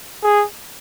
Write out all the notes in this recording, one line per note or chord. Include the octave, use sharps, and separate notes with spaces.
G#4